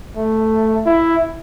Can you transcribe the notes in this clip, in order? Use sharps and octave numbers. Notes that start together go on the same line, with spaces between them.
A3
E4